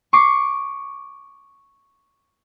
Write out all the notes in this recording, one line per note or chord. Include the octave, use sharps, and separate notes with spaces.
C#6 D6 C7 D7